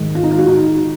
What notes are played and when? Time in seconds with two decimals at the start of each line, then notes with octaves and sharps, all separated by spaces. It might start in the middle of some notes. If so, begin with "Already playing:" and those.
Already playing: G#2 D#3 G#3
0.15 F4
0.24 D#4
0.31 F4
0.39 F#4
0.48 D#4